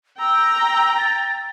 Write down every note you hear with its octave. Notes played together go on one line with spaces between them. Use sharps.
G5 A#5 E6
A6